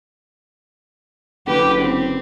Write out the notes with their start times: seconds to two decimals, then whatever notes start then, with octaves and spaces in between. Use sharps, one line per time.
1.47 F#1 D3 G4 B4
1.82 C4